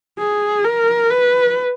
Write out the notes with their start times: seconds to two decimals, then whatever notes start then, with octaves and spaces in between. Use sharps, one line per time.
0.19 G#4
0.64 A#4
1.11 B4